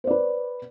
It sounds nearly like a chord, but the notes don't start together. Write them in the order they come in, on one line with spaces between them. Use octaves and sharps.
C5 D5 B4